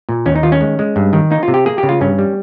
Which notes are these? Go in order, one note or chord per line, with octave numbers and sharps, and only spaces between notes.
A#2
D#2 C#4
D#4
D#3 F4
C#4
G#3
G#3
G2
D#3
A#3 D#4
F4
C3
G4
A#3 G#4
G4
C#3
F4
G2 C#4
G3